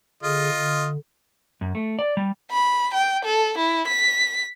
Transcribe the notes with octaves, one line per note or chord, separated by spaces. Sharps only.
D3 F4 G#4 D#5
D3
F#2
A3
D5
G3
B5
G5
A4
E4
B6